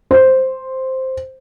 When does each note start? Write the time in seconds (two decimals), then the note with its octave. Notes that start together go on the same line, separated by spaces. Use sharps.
0.11 C5